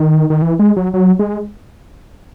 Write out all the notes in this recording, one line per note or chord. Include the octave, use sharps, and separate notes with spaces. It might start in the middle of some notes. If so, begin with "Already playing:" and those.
Already playing: D#3
D#3
E3
G#3
F#3
F#3
G#3